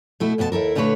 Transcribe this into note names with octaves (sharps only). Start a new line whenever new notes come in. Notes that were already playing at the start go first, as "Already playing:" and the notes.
B2 A3 E4
F2 B2 B3 F#4 A5
D#2 E4 A4 A#4
A#2 D3 A3 E4 B4 C#5